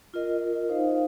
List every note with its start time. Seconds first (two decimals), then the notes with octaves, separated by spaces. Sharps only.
0.14 F4 A#4 D#5
0.69 D#4 C5 F5